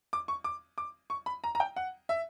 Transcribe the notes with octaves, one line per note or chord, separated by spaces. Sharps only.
D6
C#6
D6
D6
C#6
B5
A#5
A#5
G5
F#5
E5